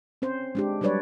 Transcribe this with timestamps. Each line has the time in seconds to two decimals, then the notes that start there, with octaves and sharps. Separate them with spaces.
0.22 C4 C#4 C5
0.55 G#3 D4 G4
0.81 F#3 G3 D4 B4 C#5 D5